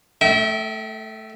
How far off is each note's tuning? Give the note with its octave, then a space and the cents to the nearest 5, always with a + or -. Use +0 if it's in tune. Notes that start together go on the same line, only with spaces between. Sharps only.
A3 +0 E5 -45 G5 -30